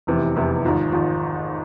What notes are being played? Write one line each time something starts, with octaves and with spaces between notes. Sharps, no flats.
F1 E2 C3 E3
F1 E2 C3 E3
G#1 G#2 F3
G#1 G#2 F3